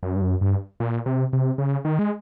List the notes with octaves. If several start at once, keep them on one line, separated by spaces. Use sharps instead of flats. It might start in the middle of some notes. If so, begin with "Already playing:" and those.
F#2
G2
F#2
G2
A#2
C3
C3
C#3
D#3
G#3